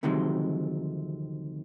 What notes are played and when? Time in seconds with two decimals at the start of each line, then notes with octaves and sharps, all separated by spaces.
0.03 D2 C3 D#3 F3 F#3 G#3